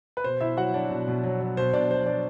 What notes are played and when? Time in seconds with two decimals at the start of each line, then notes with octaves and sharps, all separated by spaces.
0.17 B4
0.24 B2 C5
0.41 B2 E4 E5
0.57 F#3 F#4 F#5
0.74 F#3 D4 D5
0.91 B2
1.08 B2
1.24 F#3
1.41 F#3
1.57 B2 C5
1.73 B2 D4 D5
1.90 F#3 C5
2.06 F#3 D4 D5